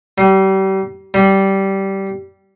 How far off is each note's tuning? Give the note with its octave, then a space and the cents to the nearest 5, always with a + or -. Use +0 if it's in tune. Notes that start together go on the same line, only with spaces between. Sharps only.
G3 -35
G3 -15